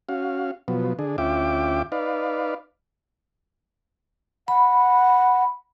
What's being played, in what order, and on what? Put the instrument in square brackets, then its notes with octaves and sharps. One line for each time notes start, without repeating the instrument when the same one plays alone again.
[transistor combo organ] C#4 F#4 F5
B2 F3 F#3 B3
D3 D4 G#4
D2 C#4 F4 E5 G5 D6
D#4 B4 D5 F5
[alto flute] F#5 [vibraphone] B5